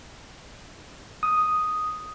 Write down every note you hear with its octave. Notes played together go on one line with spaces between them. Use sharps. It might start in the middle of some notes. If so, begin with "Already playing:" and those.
D#6